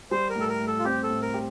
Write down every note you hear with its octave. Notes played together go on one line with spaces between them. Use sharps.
G3 C5
A#4
A2
A4
A#4
A2
A4
F4
C4 G4
A4
A2
A#4
G4